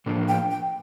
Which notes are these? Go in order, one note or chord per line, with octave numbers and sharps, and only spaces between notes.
A2 F3 A#3 D4
G5
G5